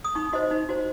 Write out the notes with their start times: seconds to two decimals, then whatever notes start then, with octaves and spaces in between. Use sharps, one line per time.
0.04 D#6
0.15 D#4 C#6
0.33 F#4 C5 D#5
0.51 D#4
0.69 F#4 C5